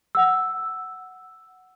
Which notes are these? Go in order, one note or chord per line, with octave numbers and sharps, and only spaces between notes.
F#5 E6